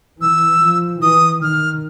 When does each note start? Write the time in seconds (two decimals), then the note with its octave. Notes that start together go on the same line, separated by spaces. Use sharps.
0.21 E3 E6
0.62 F3
1.01 E3 D#6
1.42 D#3 F6